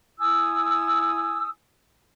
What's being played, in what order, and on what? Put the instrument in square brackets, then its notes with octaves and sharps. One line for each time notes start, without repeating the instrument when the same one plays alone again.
[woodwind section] E4 G#5 D#6 E6